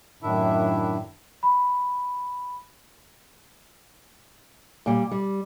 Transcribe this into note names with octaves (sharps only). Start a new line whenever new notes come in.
F#2 A2 D#3 D4 E4 E5
B5
A#2 G3
G3